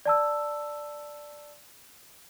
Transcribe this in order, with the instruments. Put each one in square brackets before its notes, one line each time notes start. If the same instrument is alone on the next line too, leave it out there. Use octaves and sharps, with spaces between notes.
[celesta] D5 A5 E6